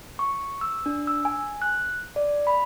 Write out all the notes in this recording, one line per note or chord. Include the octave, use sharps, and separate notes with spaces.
C#6
E6
D4
E6
G#5
F#6
D5
B5